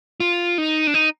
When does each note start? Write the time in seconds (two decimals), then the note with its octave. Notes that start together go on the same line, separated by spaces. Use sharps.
0.20 F4
0.58 D#4
0.87 D4
0.94 D#4